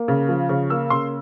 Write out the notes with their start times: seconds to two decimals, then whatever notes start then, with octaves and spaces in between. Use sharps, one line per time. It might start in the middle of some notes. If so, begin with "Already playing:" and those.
Already playing: A#3
0.08 C#3
0.29 F3
0.49 C#3
0.70 A#3 E6
0.90 C#3 C6